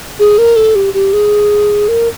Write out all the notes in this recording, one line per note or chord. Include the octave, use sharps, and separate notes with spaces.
G#4
A#4
A4
G4
G4
G#4
A#4